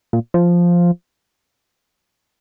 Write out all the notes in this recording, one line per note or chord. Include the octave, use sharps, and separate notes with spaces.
A#2
F3